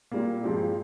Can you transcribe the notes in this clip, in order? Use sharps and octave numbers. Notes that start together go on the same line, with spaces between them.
A#2 G3 A#3
G2 F3 G#3 C4 G4